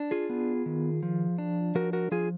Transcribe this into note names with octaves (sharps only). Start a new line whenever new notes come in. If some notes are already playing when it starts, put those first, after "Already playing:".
Already playing: D4
F4 G#4
B3
D#3
F3
D4
F3 F#4 A#4
F#4 A#4
F3 F4 G#4